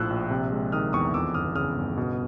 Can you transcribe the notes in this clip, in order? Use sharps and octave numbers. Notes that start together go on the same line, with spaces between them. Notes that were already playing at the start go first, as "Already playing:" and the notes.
Already playing: A#1 A2 F3 E6 F#6
A#1
C3
G#3
D#3 D#6 F6
E2 C#6 D#6
F2 D6 E6
G1 D#6 F6
C#3 D#6 F6
G1
B2